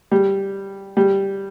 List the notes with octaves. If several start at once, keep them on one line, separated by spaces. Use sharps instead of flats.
G3
G3